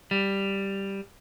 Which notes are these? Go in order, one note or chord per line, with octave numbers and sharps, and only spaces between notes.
G3